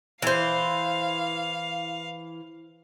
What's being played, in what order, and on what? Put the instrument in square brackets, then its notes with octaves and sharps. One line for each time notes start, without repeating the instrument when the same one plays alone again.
[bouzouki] E3 C5 [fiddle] F5